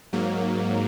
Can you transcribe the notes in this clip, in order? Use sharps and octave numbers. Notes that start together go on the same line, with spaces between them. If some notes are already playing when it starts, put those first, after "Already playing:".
G#2 F#3 A#3